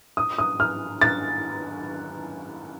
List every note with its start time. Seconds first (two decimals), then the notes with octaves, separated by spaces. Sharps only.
0.17 D#6
0.38 D#6
0.60 F6
1.01 A6